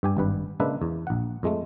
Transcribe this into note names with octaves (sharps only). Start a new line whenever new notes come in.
G2 G4 G#5
G#1 G2 B4
C#3 G#3 A#3 D4 B4 E5
E2
A#1 F#5
F2 G#3 A3